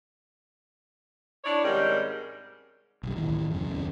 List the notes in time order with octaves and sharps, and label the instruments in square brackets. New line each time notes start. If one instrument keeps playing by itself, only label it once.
[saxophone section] D4 E4 C#5 D5
G#2 C3 D#3 G3 C#4 G4
[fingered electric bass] B1 G2
A1 D#2 E3
F#2 C#3
D#2 A3 C#4